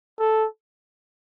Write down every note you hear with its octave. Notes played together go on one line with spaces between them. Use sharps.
A4